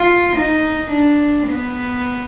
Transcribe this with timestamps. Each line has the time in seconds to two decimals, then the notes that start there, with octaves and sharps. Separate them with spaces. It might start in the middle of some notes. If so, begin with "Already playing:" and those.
Already playing: F4
0.36 D#4
0.91 D4
1.46 B3